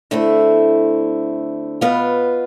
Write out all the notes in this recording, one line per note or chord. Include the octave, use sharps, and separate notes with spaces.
D3 A3 C4 E4
B2 B3 F4 B4